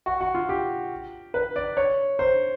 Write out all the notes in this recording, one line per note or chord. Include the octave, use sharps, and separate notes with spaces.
F#4
F#4
F4
G4
B4
D5
C#5
C5